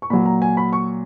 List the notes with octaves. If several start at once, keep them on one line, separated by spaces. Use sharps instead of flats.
C#6
A#2 F#3 B5
A#5
G#5
B5
C#6